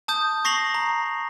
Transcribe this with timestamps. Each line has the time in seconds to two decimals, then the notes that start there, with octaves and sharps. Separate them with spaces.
0.08 A5 D#6 G6
0.45 C#6 A#6 C7 F7 F#7
0.74 A#5